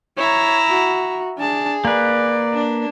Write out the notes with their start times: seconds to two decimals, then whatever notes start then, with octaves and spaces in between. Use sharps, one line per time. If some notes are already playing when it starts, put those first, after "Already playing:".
0.18 E4 C#5 A#5
0.70 F#4
1.38 D4 G#4 A5
1.85 A#3 B4 D5
2.53 D4